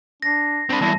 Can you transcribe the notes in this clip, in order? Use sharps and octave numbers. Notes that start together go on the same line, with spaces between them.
D4 A#6 C7
C4 D4 B5
E2 G2 E4 A5 A#6